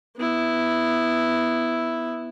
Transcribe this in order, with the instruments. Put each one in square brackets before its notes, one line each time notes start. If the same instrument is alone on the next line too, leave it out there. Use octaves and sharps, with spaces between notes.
[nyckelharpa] B3 E4